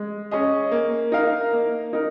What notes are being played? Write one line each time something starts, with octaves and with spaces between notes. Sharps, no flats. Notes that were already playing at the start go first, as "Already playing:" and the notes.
Already playing: G#3
C#4 G#4 D#5
A#3
D#4 A#4 F5
A#3
D#4 A#4